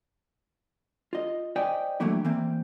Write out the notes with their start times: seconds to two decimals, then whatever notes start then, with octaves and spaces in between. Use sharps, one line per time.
1.13 F4 D#5
1.56 C5 D5 D#5 G5 G#5
2.00 D3 E3 F#3 A3 A#3 E4
2.25 E3 A#3 C4